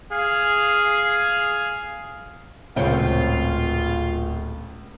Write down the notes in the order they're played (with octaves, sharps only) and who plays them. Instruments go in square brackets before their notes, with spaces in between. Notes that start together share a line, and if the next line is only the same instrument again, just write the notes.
[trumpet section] G#4 F5
[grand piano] D1 [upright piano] C#2 [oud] A#2 C4 C#5 [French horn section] F4